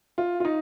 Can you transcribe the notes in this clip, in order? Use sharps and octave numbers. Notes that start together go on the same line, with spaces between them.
F4
F4
D#4